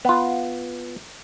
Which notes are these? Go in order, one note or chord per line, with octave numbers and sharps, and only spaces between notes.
B3 F4